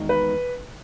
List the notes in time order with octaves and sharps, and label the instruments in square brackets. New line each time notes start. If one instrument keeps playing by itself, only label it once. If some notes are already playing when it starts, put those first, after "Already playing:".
Already playing: [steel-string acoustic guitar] E2 D#3 G#3 D#4 F#4
[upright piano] B4